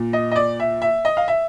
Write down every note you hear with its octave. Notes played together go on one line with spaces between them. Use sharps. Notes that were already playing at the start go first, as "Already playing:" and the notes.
Already playing: A#2
D#5
D#5
D5
E5
E5
D#5
F5
E5